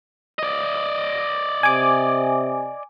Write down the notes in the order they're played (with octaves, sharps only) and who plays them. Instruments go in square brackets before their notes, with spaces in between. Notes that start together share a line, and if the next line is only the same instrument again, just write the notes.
[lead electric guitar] D5 D#5
[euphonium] C3 [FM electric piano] G#5 D6